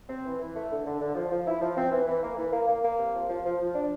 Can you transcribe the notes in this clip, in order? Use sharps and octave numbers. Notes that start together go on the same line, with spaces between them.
C4
E3
E3
A3
D3
D3
D3
F3
F3
E4
F3
C4
E3
E3
A#3
E3
A#3
A#3
A#3
C3
F3
F3
F3
F3
D4